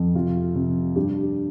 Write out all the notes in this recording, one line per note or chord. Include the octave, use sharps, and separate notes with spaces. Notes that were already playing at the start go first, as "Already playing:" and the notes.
Already playing: F2
C3 F4
C3
G2 G4